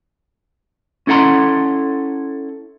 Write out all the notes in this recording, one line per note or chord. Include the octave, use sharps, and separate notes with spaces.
C#4 E4 A4 F#5 A#5 C6